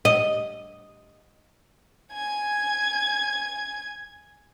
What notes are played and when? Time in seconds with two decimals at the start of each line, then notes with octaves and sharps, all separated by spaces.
0.05 D#5
2.12 G#5 G#6